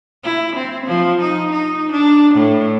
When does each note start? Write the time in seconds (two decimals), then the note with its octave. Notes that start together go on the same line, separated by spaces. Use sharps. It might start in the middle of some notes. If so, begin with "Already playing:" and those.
0.23 E4
0.56 C4
0.86 F3
1.21 D#4
1.51 D#4
1.92 D4
2.34 A2